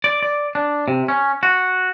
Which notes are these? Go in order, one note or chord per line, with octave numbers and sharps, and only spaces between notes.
D5
D5
D4
C3
C#4
F#4